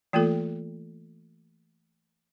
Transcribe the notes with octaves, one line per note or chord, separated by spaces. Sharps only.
E3 A3 A#3 F4 A4